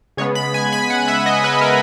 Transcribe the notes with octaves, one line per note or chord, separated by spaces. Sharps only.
C#3 G#3 B3 C#5
B5
G#5
B5
F#5
E5
D#5
B4
A#4